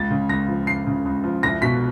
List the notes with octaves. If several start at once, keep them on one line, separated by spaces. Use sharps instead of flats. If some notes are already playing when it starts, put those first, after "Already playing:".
Already playing: C#2 A6
C#3
C#2 A#6
F3
C#2 C7
C#3
C#2
F3
C2 A#6
B2 B6